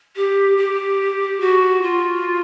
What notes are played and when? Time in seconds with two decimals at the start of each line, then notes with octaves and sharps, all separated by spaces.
0.16 G4
0.58 G4
1.41 F#4
1.82 F4